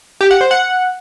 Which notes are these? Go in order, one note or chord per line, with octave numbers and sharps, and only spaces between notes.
G4
F#5
C5
F#5